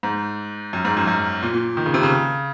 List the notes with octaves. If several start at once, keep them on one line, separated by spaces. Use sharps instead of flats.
G#2
F#2
G#2
F#2
F#2
A#2
A#2
D#3
C#3
C3
C#3